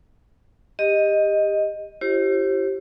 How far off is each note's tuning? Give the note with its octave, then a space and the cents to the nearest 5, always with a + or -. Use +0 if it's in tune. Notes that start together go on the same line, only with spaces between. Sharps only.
G4 +25 D#5 +0
E4 +35 G4 -20 C5 +35